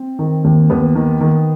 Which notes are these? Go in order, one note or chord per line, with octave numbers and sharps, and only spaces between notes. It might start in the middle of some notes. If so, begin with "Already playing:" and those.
Already playing: C4
D#3
D#2
D#2 B3
D#3
D#3